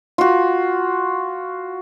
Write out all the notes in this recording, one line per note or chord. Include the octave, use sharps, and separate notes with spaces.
F4 F#4